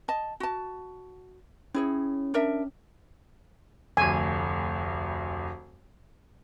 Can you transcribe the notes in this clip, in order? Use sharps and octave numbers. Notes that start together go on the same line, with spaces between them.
D#5 A5
F#4 A5
C#4 E4 G#4 C#5
D4 A#4 E5
F1 D2 G#5